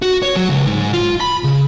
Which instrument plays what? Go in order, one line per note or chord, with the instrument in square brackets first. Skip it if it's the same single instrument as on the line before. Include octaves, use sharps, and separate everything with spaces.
[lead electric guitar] F#4
C#5
F#3
C#2
G#2
F4
B5
C#3